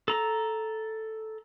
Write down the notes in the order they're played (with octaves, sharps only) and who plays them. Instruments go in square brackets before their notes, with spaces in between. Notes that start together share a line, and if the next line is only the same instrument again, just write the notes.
[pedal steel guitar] A4 A#5